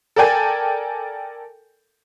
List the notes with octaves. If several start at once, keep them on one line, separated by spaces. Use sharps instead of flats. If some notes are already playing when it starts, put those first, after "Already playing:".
A4 A#4 D5 G5 G#5